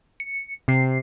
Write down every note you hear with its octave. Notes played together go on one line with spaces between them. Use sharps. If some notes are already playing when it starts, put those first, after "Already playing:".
C#7
C3 C7